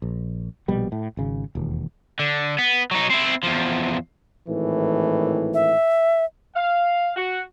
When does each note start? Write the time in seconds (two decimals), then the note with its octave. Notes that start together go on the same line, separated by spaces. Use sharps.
0.02 A#1
0.68 A#1 B2 G3
0.92 A2
1.17 G#1 C#3
1.55 E1 D#2
2.19 D3
2.58 B3
2.91 F#3 D#4
3.10 C4 E4
3.43 E2 F3
4.48 G#1 A2 E3
5.54 E5
6.56 F5
7.16 F#4